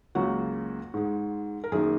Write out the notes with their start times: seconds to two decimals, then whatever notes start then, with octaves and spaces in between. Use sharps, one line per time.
0.15 C#2 C#3 F#3 A#3 F#4
0.94 G#2 G#3
1.64 A#4
1.72 F#2 D#3 A#3 G#4